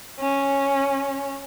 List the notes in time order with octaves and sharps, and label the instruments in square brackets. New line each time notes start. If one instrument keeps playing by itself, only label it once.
[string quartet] C#4